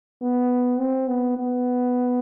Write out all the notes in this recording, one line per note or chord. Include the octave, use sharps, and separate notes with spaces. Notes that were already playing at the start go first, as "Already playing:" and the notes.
B3
C4
B3
B3